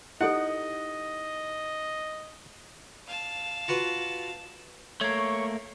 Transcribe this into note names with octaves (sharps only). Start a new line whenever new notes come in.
D#4 E4 G4 A4 D#5 F#5
F5 A5
F4 F#4 B4
A3 A#3 C#5